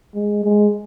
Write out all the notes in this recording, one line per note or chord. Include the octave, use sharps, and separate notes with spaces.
G#3
G#3